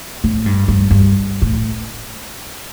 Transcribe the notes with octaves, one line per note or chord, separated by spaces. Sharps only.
A2
G2
G2
G2
A2